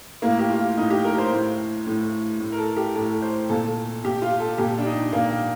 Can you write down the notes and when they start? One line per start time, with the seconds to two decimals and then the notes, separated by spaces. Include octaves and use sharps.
0.22 A2 A#3
0.39 G4
0.50 F4
0.77 A2 D#4
0.90 G4
1.05 A#4
1.18 C5
1.31 A2
1.86 A2
2.40 A2
2.52 A#4
2.58 A4
2.76 G4
2.95 A2 A4
3.22 C5
3.49 A#2 A4
4.03 A#2 G4
4.22 F4
4.40 A4
4.58 A#2 G4
4.78 D4
4.86 D#4
5.13 A#2 A#3